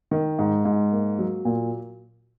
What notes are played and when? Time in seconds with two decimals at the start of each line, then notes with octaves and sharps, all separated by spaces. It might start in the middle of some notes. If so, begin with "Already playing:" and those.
0.11 D#3
0.39 G#2
0.65 G#2
0.92 A#3
1.19 F#3
1.45 A#2